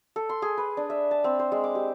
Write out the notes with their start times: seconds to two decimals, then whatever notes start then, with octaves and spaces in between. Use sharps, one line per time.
0.16 A4
0.29 C6
0.42 G#4
0.57 B4
0.77 D4
0.90 E5
1.11 A5
1.24 C4
1.39 C5
1.52 G#3
1.64 D6
1.75 G4